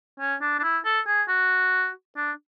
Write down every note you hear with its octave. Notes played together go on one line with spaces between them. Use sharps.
C#4
D4
D4
E4
A4
G#4
F#4
D4